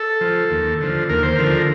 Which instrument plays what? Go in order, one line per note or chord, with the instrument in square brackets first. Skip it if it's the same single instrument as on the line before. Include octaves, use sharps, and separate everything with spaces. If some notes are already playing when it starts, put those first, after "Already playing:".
Already playing: [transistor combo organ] A4
F3
D#2
D3 F3
D#2 A#4
C5
D3 F3 A#4